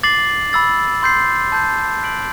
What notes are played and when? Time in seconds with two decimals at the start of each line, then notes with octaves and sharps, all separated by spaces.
0.03 D6 A6 C7 F#7
0.53 B5 E6 A6
1.03 C6 G6 C7
1.52 A5 C6 G6
2.02 F#6 B6 D7 F#7